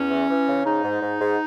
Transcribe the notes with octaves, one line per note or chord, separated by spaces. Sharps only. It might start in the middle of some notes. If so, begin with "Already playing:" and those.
Already playing: E2 C#4
E3
E3
C#3
G#2 D#4
G#2
G#2
G#2